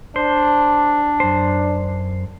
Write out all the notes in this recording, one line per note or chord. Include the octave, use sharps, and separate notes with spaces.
D4 C5
F#2 C5